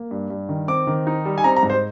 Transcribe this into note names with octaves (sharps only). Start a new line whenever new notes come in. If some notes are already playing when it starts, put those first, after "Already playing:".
Already playing: A#3
G2
G2
D#3
C4 D6
D#3
D#4
G3
G#5
C4 A#5
A#5
G#2
C5